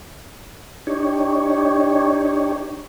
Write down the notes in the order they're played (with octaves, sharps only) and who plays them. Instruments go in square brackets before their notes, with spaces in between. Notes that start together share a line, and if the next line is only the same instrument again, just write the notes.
[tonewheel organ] D4 D#4 G4 C#5